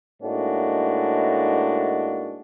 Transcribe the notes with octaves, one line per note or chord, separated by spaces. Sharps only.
A2 G#3 A#3 D4 D#4 F#4